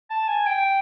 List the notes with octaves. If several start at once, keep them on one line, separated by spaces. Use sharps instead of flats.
A5
G#5
G5